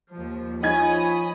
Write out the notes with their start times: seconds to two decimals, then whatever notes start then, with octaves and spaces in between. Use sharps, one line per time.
0.12 D#2 F3
0.63 F3 D#4 C#5 G#5 B5 D#6 G#6